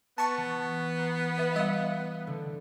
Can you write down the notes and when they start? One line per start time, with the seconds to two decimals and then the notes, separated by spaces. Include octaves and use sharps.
0.18 B3 A5 C#6
0.37 E3
0.98 A#5 C7
1.38 B4 E5
1.56 G3 D#5 F5
2.27 D3 A3